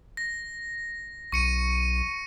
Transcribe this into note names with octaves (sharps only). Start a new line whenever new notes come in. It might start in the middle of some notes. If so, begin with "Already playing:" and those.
A#6
B1 C#6 C#7 D#7